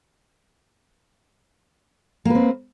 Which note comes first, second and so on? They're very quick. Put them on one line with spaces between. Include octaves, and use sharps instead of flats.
A#3 B4 C4